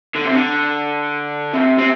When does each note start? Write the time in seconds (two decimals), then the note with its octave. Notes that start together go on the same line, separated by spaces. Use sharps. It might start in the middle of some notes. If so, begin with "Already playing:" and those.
0.15 D3
0.25 C3
0.34 D3
1.53 C3
1.78 C4